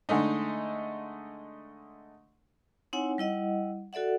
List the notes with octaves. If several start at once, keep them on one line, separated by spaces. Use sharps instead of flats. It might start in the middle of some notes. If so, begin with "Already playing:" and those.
D3 G#3 A3 D#4
C4 D#4 E4 C#5 F#5 G#5
G3 E4 D#5 F#5
F#4 A4 D5 E5 F#5